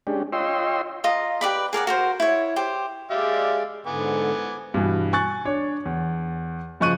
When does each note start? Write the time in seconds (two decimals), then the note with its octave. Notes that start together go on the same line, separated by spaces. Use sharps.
0.07 G#3 C#4 D4 G4
0.33 F4 C#5 D#5 G5 C6 E6
1.04 F4 D#5 A#5
1.41 G4 B4 D5 B5
1.73 G#4 A#4 D5 F#5
1.87 F#4 A#4 C5
2.20 E4 C#5
2.56 G4 C5
3.11 G#3 G4 D5 E5 F5
3.87 G#2 D3 B3 G#5 D6
4.74 G2 B2 E3
5.13 G#5 C#6 F#6 A6
5.45 D4 C#5
5.85 E2
6.80 C#3 F3 D#5 C#6 F#6 D#7